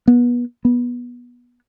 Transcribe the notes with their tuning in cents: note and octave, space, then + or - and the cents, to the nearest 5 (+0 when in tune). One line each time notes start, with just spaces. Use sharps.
B3 -30
B3 -20